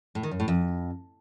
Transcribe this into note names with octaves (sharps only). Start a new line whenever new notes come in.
A2
D#3
F#2
A2
F2